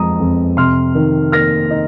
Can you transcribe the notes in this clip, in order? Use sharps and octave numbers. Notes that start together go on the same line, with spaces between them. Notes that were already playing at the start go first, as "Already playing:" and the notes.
Already playing: F2 F3 G#3 A#5 D#6
F2
C3 C6 F6
D#3
A#3 F6 A#6
D#4